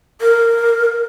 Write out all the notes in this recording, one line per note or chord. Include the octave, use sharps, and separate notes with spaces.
A#4